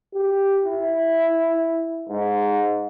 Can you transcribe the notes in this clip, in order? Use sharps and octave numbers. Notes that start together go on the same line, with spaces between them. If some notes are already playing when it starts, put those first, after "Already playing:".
G4
E4
G#2